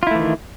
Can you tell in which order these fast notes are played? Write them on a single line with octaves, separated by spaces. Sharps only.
F4 E4 A3 E3 D#3